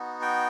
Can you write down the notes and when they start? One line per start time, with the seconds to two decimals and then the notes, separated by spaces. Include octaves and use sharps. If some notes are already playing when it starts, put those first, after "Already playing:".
Already playing: B3 D#4 F#4
0.22 G5